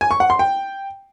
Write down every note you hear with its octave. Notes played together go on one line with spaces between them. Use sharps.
G#5
C#6
F#5
C6
G5